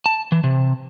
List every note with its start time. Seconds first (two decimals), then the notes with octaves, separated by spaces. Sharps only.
0.06 A5
0.32 E3
0.44 C3